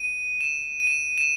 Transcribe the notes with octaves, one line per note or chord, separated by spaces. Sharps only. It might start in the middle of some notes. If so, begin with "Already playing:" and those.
Already playing: D#7
E7
D#7
E7
E7